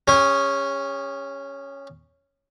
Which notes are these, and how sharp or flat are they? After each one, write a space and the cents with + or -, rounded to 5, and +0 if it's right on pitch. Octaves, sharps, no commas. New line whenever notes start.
C#4 +0 G#4 -45